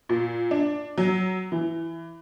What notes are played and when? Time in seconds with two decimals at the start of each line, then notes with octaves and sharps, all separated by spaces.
0.09 A#2
0.51 D4
0.98 F#3
1.52 E3